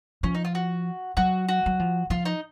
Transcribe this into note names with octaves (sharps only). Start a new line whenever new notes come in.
F3 C#4
D#4
F4
F#4
F#3 F#4
F#4
F#3
F3
F3 F4
D#4